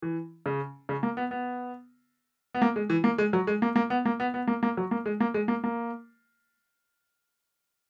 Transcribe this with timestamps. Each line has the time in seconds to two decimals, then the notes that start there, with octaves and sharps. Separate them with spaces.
0.02 E3
0.46 C#3
0.89 C#3
1.03 A#3
1.17 B3
1.31 B3
2.54 B3
2.62 A#3
2.76 G#3
2.90 E3
3.04 A#3
3.18 G#3
3.33 F#3
3.47 G#3
3.62 A#3
3.76 A#3
3.90 B3
4.05 A#3
4.20 B3
4.34 B3
4.48 A#3
4.63 A#3
4.77 F#3
4.91 A#3
5.06 G#3
5.20 A#3
5.34 G#3
5.48 A#3
5.64 A#3